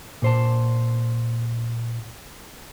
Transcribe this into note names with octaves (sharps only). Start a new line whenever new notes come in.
A#2 C5 A5